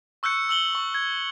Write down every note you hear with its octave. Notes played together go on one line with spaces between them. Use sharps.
C#6 E6 F#6 G6 C#7
E6 F#7 G7
C#6
G#6